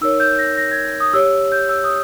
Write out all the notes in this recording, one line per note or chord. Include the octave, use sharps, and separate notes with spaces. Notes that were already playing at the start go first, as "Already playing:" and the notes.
D#4 A#4 C#5 E6
G6
A#6
A#6
G#6
D#6
G4 C#5 E6
G6
E6
D#6